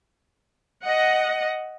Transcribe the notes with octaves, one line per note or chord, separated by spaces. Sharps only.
D#5 F#5